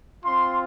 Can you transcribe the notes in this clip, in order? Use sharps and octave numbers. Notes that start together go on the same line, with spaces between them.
C4 F4 C6